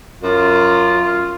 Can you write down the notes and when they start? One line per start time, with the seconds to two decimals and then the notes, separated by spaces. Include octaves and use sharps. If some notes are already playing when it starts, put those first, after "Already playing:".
0.23 F#2 F4